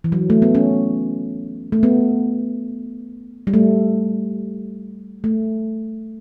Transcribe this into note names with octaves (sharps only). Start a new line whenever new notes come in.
E3
F#3
A3
B3
C#4
A3
B3
G3
A3
A3